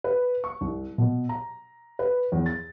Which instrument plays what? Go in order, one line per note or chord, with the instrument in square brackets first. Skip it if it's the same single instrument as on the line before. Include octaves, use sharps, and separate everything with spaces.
[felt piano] B4
C#6
C2
B2
A#5
B4
E2
A6